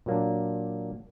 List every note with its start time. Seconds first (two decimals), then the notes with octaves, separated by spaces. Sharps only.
0.06 A#2 F#3 A#3 D4